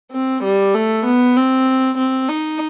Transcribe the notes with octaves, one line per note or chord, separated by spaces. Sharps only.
C4
G3
A3
B3
C4
C4
D#4